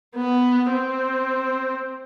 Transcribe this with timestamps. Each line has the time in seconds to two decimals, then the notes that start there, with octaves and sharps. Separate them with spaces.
0.15 B3
0.72 C4